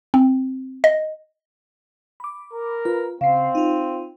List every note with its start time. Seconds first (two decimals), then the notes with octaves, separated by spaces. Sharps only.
0.14 C4
0.84 D#5
2.20 B5 D6
2.54 A#4
2.85 F4 B4
3.21 C#3 C4 F5 C7
3.55 D#4 F4